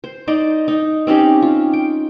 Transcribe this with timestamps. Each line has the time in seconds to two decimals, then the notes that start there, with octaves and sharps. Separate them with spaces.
0.04 C5
0.28 D#4 C5 D5 D#5
0.68 D#4
1.07 C4 C#4 D#4 G4
1.42 F4
1.73 G5